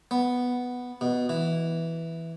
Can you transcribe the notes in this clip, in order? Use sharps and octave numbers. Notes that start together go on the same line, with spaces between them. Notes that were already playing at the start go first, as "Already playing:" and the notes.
B3
B2
E3